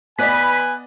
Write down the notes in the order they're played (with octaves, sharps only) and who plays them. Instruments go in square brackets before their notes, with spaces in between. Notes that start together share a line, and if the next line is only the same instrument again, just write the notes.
[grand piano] B3 D5 D#5 [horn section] B4 G#5 [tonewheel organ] B5